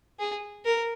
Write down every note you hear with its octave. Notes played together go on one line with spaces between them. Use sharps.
G#4
A#4